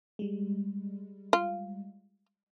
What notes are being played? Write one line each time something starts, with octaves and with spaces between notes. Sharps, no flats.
G3 G#3
F4